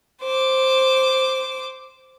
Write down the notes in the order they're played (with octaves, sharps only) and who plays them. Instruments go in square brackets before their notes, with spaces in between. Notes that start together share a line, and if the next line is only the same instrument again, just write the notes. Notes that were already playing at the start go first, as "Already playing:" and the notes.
[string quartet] C5 D6